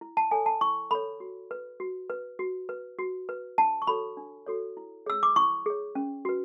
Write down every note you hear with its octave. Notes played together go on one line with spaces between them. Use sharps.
E4
A5
A4 C#5 G#5
A5
E4 C#6
A4 C#5 B5
F#4
B4
F#4
B4
F#4
B4
F#4
B4
D4 A5
C#6
F#4 A4 C#5 B5
D4
F#4 A4 C#5
E4
G#4 C#5 E6
D6
E4 C#6
G#4 C#5
C#4
F#4 B4